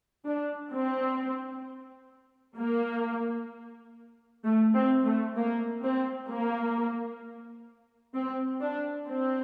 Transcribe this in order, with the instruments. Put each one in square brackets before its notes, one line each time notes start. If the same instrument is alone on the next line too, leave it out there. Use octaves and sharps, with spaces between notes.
[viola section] D4
C4
A#3
A3
C4
A3
A#3
C4
A#3
C4
D4
C4